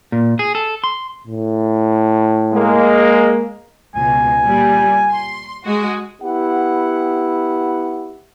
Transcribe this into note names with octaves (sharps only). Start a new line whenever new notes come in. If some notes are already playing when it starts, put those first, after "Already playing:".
A#2
G#4
A4
C6
A2
G#3 A#3
C#2 B2 G#5
A#2 G3
C6
G#3 F#4
B3 E4 G4 F#5